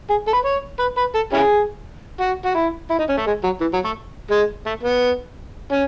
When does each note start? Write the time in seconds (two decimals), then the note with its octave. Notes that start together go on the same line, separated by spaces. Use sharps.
0.10 G#4
0.28 A4
0.33 B4
0.45 C#5
0.79 B4
0.97 B4
1.15 A4
1.33 C#4 E4 G#4
2.20 F#4
2.45 F#4
2.55 E4
2.90 E4
2.99 D#4
3.09 C#4
3.18 A3
3.26 G#3
3.44 F#3
3.61 E3
3.73 F#3
3.85 A3
4.31 G#3
4.66 A3
4.83 B3
5.72 C#4